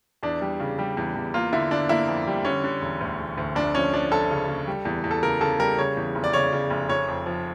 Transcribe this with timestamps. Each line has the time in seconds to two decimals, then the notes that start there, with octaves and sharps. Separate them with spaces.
0.23 E2 D4
0.41 G3
0.60 C#3
0.79 G3
0.97 E2
1.16 E2
1.34 A#3 F4
1.53 D3 E4
1.71 D3 D4
1.89 A#3 E4
2.08 F2
2.27 G3
2.45 D3 C#4
2.64 D3
2.81 E1
3.01 D2
3.20 E1
3.38 D2
3.55 F1 D4
3.75 F3 C#4
3.93 F3 D4
4.11 F1 A4
4.31 C#3
4.48 C#3
4.67 G3
4.85 E2
5.04 E2
5.11 A4
5.23 C#3 A#4
5.41 C#3 A4
5.59 G3 A#4
5.78 C#3 C#5
5.97 E2
6.15 F1
6.24 D5
6.33 C#3 C#5
6.52 C#3
6.70 F1
6.89 F1 C#5
7.08 F2
7.26 F3